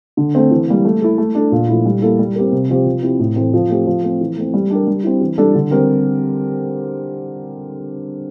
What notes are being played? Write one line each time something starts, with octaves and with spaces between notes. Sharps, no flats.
D3
A3 C4
E3
G3 A#3
A3
E4 A4
A3
D4 A4
A#2
F3 A3 E4
G3
A#3 E4 A4
G3
C4 G4 A#4
C3
F3 C4 G4
F3
C4 E4 G4
A2
E3 A3 C4
F3
A3 C4 G4
F3
A3 C4
E3
A3 C4
G3
D4 G4 A#4
G3
C4 E4
E3
G3 D4 A4
D3
G3 C4 G4 A#4